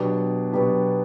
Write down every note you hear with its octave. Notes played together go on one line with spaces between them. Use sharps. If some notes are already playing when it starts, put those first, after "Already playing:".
Already playing: B2 F#3 B3 D4 G4
B2 F#3 B3 D4 G4